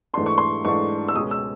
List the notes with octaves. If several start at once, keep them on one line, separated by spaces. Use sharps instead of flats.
G#2 E3 A3 D4 C6
C#6
C6
G#2 E3 A3 D4 C#6
E6
C#2 B2 G#3 C#4 D#6
E6